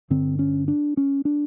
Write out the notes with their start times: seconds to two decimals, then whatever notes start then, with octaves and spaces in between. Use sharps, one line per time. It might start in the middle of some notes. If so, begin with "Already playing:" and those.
0.10 G2 D3 C4
0.39 C#4
0.68 D4
0.97 C#4
1.25 D4